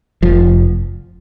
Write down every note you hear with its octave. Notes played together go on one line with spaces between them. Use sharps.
F1 F3